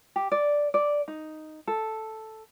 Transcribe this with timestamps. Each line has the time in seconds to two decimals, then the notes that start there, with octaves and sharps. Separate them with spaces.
0.16 G4
0.32 D5
0.74 D5
1.08 D#4
1.67 A4